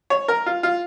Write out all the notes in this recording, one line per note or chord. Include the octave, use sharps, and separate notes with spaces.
C#5
A#4
F4
F4